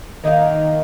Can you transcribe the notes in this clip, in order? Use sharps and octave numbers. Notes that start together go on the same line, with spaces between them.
D#3 A#3 D#4 A#4 F5